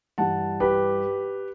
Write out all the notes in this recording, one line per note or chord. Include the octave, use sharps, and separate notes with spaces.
G2 E3 G3 F#5 A5
G4 B4